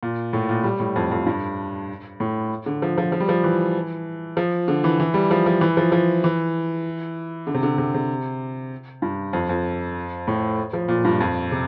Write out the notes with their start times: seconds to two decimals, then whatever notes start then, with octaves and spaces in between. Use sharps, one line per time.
0.03 A#2
0.33 A2
0.49 A#2
0.64 G3
0.80 A2
0.96 F2
1.11 F2
1.26 G2
2.20 A2
2.66 D3
2.82 F3
2.98 F3
3.12 F3
3.20 G3
3.29 F3
3.44 E3
4.37 F3
4.68 D3
4.84 E3
5.00 E3
5.14 G3
5.31 F3
5.46 F3
5.61 E3
5.77 F3
5.92 F3
6.24 E3
7.47 D3
7.55 C3
7.63 D3
7.78 C3
7.94 C3
9.02 G2
9.33 F2
9.49 F2
10.28 A2
10.73 F3
10.88 A#2
11.05 G2
11.20 F2
11.51 C3